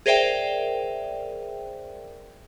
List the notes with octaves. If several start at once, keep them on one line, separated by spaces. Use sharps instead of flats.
G#4 A#4 C5 D5 E5 G5